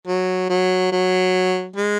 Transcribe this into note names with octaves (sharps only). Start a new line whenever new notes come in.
F#3
F#3
F#3
G#3